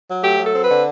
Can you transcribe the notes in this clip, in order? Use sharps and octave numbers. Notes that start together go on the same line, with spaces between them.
F#3
A3 G4
F#3
A4
C4
D3 B4